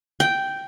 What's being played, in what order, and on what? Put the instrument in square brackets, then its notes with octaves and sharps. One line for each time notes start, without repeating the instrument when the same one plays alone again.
[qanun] G5